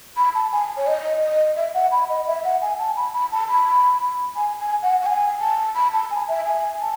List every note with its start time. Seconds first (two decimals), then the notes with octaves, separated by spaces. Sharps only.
0.17 B5
0.35 A5
0.52 G#5
0.77 C#5
0.87 D#5
1.22 D#5
1.57 E5
1.74 F#5
1.92 B5
2.09 D#5
2.27 E5
2.44 F#5
2.62 G#5
2.79 A5
2.96 B5
3.14 B5
3.32 A5
3.49 B5
4.36 G#5
4.59 G#5
4.82 F#5
5.01 F#5
5.06 G#5
5.41 A5
5.75 B5
5.93 A5
6.11 G#5
6.28 E5
6.45 G#5
6.81 A5